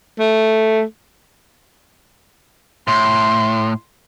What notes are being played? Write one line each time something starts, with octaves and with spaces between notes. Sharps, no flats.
A3
A2 C6